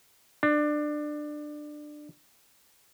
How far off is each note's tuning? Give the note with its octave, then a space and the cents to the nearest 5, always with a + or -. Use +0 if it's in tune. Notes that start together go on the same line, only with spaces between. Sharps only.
D4 +20